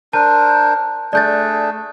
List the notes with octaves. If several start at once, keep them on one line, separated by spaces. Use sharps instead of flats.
D4 A#4 C5 A5
A3 D4 G#4 D5 G6 A6